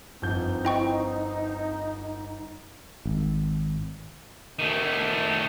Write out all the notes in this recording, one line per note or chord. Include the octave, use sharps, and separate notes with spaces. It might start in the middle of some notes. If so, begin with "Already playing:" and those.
G1 F3 C4 D#4 G6
E4 G5 C#6
G#1
D#3 A3